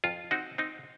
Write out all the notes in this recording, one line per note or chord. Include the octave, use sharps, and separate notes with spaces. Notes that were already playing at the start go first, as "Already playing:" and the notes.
F2 F4
C4 D#4 F#4
C4 D#4